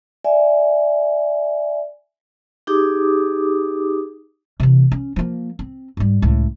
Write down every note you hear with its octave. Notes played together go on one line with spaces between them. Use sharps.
D5 E5 G#5
D#4 G4 G#4 D6 D#6
C3 E3
C#4
F3 A#3
C4
G#2 G3
C#2 A2